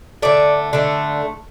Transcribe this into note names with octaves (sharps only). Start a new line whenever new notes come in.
D3 A3 D5
D3 A3